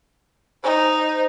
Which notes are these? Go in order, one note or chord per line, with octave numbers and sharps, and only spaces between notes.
D#4 C5